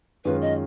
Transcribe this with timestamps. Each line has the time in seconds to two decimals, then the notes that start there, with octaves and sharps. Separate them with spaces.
0.25 F#2 D#3 G#3 C#4 F4 B4
0.41 D#5